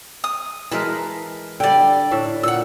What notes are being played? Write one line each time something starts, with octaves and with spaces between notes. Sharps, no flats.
D#6
E3 G#3 A#4 A5 B5
D3 G3 D5 G5
A2 D4 E5
A#2 F#5 E6